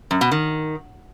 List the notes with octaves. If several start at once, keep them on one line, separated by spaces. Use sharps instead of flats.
F#2
B2
D#3